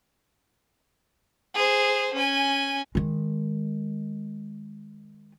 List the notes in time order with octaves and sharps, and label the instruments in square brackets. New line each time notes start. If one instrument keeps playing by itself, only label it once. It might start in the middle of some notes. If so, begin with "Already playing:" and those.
[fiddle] G#4 C5
C#4 G#5
[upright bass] D#3 G#3